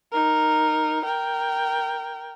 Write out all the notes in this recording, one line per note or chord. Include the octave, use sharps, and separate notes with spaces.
D#4 A#4
A#4 G5